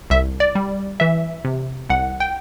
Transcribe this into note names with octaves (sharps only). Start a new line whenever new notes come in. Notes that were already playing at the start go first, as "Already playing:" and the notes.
C2 E5
D5
G3
E3 E5
C3
C2 F#5
G5